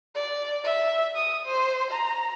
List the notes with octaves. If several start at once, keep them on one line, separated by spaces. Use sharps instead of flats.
D5
E5
D#6
C5
A#5